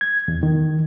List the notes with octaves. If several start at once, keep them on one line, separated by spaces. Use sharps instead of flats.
G#6
E2
D#3